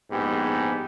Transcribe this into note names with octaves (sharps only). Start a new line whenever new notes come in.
A#1 G#2 B3 G4